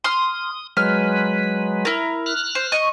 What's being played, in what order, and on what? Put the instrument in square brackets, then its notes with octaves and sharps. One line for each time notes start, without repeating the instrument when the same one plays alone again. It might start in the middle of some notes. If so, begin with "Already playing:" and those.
[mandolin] C6 F6 [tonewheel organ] D#6
[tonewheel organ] F#3 G#3 B4 [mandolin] F6
[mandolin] E4 A#4
[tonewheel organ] F6 F#6
[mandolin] C5
D#5 C#6